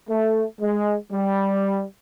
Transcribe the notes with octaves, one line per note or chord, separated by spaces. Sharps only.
A3
G#3
G3